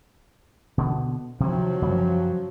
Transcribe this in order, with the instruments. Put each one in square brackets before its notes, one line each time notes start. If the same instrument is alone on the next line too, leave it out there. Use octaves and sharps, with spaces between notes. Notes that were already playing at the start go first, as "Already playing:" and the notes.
[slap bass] B2 D3 B3
[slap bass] C3 D#3 [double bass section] F3 F#3
[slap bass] F#2 C#3 G3